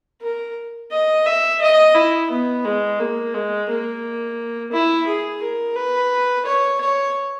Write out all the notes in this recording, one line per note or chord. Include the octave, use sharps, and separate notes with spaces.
A#4
D#5
E5
D#5
E4
B3
G#3
A#3
G#3
A#3
E4
G#4
A#4
B4
C#5
C#5